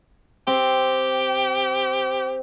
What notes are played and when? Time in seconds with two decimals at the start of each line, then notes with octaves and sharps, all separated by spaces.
0.47 C4 G4